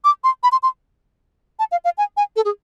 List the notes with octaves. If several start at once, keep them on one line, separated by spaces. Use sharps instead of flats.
D6
C6
B5
C6
C6
A5
F5
F5
G#5
G#5
A4
G#4